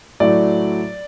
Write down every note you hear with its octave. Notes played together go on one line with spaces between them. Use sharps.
A2 F#3 A3 D5